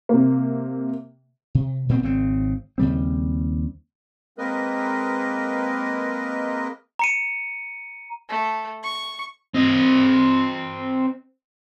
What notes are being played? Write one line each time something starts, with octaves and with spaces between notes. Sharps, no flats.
C3 A#3
C3
A#2 B3 C4
G#1 C#3 C4
D#2 C#3 G3 C4
G#3 A#3 C4 A#4 B4 D#5
A#5 C#7 D#7
A3
C#6
C4 D#5